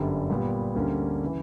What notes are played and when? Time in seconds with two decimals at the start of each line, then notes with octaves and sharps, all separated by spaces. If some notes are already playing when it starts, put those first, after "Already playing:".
Already playing: G1 F#2 D3 G3
0.30 A#2 G3 B3
0.75 D2 D3 G3 A#3 C#4
1.23 C#3 E3